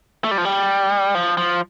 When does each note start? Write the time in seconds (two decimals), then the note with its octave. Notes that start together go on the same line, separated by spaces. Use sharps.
0.24 A3
0.31 G3
0.38 F3
0.45 G3
1.15 F3
1.37 F3